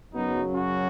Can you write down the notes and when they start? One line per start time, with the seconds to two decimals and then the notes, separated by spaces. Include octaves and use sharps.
0.13 F#2 C#3 F#3 B3 D#4
0.52 C#4 F#4